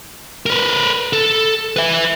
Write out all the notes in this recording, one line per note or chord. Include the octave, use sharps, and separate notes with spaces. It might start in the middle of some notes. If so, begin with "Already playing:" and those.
A#4 B4
A4
B4 E5